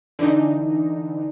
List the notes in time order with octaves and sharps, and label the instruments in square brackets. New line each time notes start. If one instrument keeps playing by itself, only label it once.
[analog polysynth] D3 E3 D4 D#4